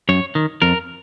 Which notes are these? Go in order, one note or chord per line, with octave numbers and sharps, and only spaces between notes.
F#2 C#5
D#3
F2 A#4